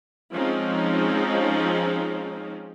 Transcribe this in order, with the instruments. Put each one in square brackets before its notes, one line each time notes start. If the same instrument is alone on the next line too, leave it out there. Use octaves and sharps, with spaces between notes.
[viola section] F3 G#3 C4 C#4 D#4